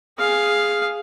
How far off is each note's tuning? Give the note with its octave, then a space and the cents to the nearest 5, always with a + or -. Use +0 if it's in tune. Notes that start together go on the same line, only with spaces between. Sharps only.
G#4 +0 F5 +0